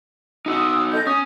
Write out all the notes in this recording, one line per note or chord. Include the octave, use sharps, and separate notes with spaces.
D#4 F#4 D#6 E6
A4 D#5 G6
C#4 D#6